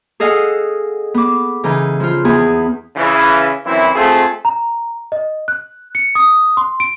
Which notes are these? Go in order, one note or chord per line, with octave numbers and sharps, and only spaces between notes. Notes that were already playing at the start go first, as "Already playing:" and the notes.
G#4 A4 D#5 F5 F#5 G#5
B3 D6
C#3 E3 D#4
F3 F4
E2 B3 G#4
C#3 E3
F#2 E3 C4 E4
A3 C4 F4 G#4 A4
A#5
D#5
F#6
C#7
D#6
C6
D7